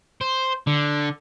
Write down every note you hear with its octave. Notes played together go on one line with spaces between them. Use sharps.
C5
D3